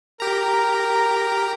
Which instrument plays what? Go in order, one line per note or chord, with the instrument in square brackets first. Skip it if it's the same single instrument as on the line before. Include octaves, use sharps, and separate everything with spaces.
[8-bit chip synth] G4 A#5 [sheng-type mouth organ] A#4